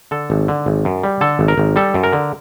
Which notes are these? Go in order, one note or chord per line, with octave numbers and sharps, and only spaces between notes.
D3 A4
G#1
D3
G#1
F#2
G3
D3 A4
G#1
A#4
G#1
G3 A4
F#2
A#4
D3